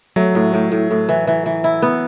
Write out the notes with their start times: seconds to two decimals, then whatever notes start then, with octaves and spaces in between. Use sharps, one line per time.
0.16 F#3 A3
0.35 A2
0.54 A2
0.72 A2
0.91 A2
1.09 E3
1.27 E3
1.46 E3
1.64 E4
1.82 B3